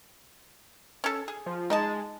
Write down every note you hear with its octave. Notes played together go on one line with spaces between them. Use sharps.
C#4 A4
G#4
F3
G#3 D#4 D#5 A5